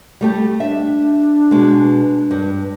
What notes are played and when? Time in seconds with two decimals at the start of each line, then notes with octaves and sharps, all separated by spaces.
0.21 G3 A3 G4
0.60 D4 E5
1.51 B2 G#3
2.31 G2